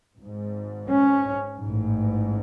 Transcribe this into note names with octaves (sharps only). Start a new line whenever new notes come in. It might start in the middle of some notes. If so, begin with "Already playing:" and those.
G#1 G#2
C#4
A1 G#2